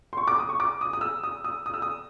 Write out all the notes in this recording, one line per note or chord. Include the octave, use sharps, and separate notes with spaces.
C6
C#6
D6
D#6
C#6
D6
D#6
D#6
E6
D#6
D#6
D#6
E6
D#6